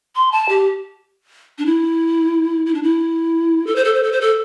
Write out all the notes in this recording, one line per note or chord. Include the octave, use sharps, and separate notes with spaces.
C6
A5
G4
D4
E4
E4
D4
E4
A4
C5
A4
C5
A4
C5
A4